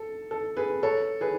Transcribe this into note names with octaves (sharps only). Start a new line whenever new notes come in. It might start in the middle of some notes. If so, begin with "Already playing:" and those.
Already playing: A4
A4
G#4 B4
A4 C#5
G#4 B4